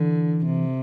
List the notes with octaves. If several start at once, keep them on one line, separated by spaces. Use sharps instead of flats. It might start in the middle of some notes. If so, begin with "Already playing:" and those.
Already playing: D3 E3
C3